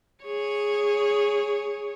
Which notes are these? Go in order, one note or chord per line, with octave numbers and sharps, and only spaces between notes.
G#4 C#5